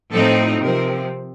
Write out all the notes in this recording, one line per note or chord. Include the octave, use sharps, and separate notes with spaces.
A2 F3 C4 D#4 A4
C3 F3 C4 A#4